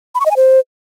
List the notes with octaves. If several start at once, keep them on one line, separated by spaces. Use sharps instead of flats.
B5
C#6
D#5
G#5
C5